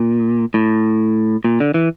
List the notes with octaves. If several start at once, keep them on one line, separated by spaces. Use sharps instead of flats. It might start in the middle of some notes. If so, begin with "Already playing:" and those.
Already playing: A#2
A2
A#2
D3
E3